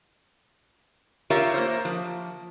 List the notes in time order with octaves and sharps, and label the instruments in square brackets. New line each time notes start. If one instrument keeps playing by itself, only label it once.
[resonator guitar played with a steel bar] F4 G4 A#4 C#5 E5 F5
A#3 C5
F3